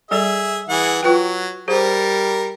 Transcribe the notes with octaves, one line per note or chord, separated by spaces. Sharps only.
G3 G#4 A4 D5 E5
E3 G#4 F#5
F#3 F4 B4 G5
G3 G#4 A#4 C5